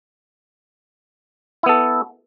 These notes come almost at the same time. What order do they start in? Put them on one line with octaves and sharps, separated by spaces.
E4 B3 A4